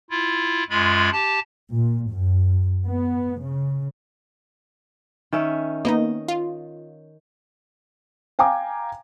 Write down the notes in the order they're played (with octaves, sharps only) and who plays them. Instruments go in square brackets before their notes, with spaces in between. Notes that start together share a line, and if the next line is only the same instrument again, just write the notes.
[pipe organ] E4 F4
F#2 G#3 F4 B5
G4 A5
[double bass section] A#2
F#2
B3
C#3
[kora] D#3 C#4 E5
[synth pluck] A#3 B3 D#4 [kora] D#5
[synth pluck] F4
[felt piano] F5 G5 G#5 A#5 D6